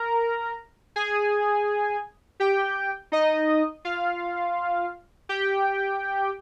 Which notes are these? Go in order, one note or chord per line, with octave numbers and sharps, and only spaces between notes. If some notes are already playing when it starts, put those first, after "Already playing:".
Already playing: A#4 A#5
G#4 G#5
G4 G5
D#4 D#5
F4 F5
G4 G5